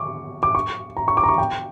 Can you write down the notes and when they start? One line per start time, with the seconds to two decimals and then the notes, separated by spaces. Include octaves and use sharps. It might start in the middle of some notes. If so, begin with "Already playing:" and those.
Already playing: C#6 D6
0.43 D6
0.55 C#6
0.97 A#5
1.08 C#6
1.17 D6
1.24 A#5
1.29 C#6
1.38 G5